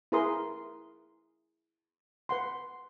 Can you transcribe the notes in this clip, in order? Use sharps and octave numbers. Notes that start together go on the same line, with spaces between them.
E4 G#4 A#4 B4 C6 D#6
B4 F#5 C6